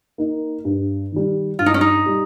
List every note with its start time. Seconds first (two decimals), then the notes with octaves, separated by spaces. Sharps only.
0.18 A#3 D#4
0.65 G2
1.12 D#3 G3
1.59 G2 F4
1.66 D#4
1.74 C#4
1.81 D#4
2.06 G3